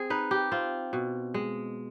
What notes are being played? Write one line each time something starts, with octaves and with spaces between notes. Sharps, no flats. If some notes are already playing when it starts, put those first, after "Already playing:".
Already playing: C4 G#4
D#4 B4
G4
C4 F4
B2
G#3